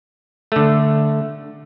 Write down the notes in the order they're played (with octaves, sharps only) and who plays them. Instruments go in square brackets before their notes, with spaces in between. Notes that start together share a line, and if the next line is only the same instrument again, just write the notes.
[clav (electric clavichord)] D3 A3